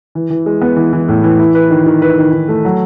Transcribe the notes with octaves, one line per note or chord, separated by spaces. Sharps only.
E3
E3
G#3
B3
E3
E3
A2
E3
E4
B4
D#3
D#3
B4
D#3
D#3
A3
F#3